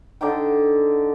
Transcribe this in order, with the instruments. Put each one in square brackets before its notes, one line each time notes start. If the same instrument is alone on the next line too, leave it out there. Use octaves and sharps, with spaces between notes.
[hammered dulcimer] D3 D4 D#4 G5